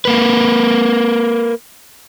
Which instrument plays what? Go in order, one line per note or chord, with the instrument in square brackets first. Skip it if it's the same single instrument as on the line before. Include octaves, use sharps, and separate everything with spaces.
[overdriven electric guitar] A#3 B4